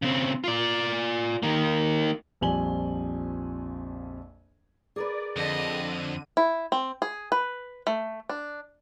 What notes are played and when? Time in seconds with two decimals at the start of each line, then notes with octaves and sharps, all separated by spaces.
0.02 C#3 C4
0.44 F4 D5
1.43 D#3 A#3
2.41 A#1 F2 G3 G#5 F#7 G7
4.96 G#4 A#4 B4 D5
5.36 F2 D3 D#5 D#7
6.37 E4
6.72 C4
7.02 G#4
7.32 B4
7.87 A3
8.29 D4